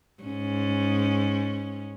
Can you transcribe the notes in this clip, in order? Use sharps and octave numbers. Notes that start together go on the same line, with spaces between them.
G#2 C#4